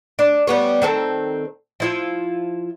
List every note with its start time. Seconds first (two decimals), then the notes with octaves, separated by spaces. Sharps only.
0.19 D4
0.47 G3 B3 C#5
0.82 D#3 C4 A4
1.80 F3 E4 F4